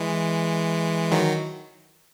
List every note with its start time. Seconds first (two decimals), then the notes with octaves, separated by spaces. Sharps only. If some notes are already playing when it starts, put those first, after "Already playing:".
Already playing: E3 G#3
1.12 D#3 F#3